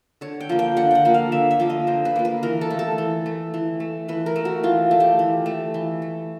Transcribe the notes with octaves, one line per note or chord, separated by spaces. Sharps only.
D3 C#5
G5
F3 A#3
G5
D3 F#5
F#5 G5
F3 A#3
F5
D3 E5
E5
F3 A#3
D#5
D3 C5
B4
F3 A#3
B4
E3 A#4
A4
A3
A4
E3
A3
E3
A3
E3 B4
A#4
A3
F#4
E3 F4
A3
G4
E3
A3
E3
A3